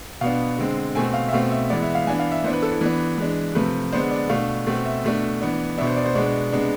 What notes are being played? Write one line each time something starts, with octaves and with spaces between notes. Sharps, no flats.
B2 B3 D4 F5
D3 G#3 C4
B2 A3 C4 G#5
F5
E5
B2 A3 C4 F5
E5
E3 G#3 B3 D5
E5
F5
E3 B3 D4 G#5
F5
E5
E3 B3 D4 C5
B4
A4
E4
E3 B3 D4
E3 G#3 D4
C3 F3 A3 B4
D3 G#3 B3 D4 C5
D5
B2 A3 D4 F5
B2 A3 C4
E5
B2 A3 D4
E3 B3 D4
B2 B3 D4 E5
C5
D5
C5
B2 G#3 B3 D4 D5
C3 G#3 B3 D4